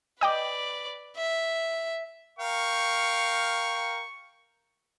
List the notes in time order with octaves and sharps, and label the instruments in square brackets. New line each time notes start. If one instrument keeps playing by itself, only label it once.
[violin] B4 D5 [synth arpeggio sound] D#5 G5 D6
[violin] E5
[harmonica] A#4 F5 G5 [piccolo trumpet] C#6